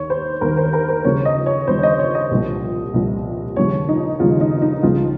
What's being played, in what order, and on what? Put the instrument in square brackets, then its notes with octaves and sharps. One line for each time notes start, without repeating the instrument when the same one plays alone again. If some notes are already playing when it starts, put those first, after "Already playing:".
Already playing: [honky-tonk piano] D#2 D#3 C#5
C5
D#2 D#3 A#4
C5
A#4
C5
D#2 C#3 F3 C#5
D#5
C#5
D#2 C#3 F3 C5
C#5
D#5
C#5
D#5
C2 A#2 F3
C2 A#2 F3
D#2 C#3 F3 C#5
D#4
D#2 C#3 F3 F4
D#4
D#4
C#2 C#3 F3 F4